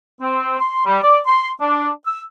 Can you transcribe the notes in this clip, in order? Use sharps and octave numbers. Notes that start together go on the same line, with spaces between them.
C4
C6
G3
D5
C6
D4
E6